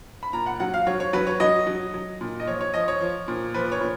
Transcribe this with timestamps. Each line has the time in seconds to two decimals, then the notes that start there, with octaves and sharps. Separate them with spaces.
0.23 B5
0.33 A#2 A#5
0.46 F#5
0.60 F#3 F#5
0.74 F5
0.87 F#3 C#5
1.00 C#5
1.13 F#3 B4
1.27 C#5
1.40 F#3 D#5
1.67 F#3
1.94 F#3
2.21 A#2
2.40 D#5
2.48 F3 C#5
2.61 C#5
2.74 F3 D#5
2.88 C#5
3.01 F3
3.28 A#2
3.54 F3 B4
3.72 C#5
3.81 A#2